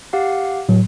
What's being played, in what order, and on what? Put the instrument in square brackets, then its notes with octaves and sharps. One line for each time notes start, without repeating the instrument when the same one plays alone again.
[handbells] G4 F5 F#5
[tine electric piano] A2 F#3